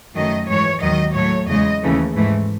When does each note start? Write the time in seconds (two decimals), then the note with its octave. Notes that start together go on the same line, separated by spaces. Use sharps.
0.15 F#2 D#3 F#3 A3 D#5
0.47 G#2 E3 G#3 C#5
0.81 D#2 D#3 F#3 D#5
1.14 A2 F#3 A3 C#5
1.48 E2 C#3 G#3 D#5
1.82 D#2 C#3 E3 A3
2.16 G#2 E3 A3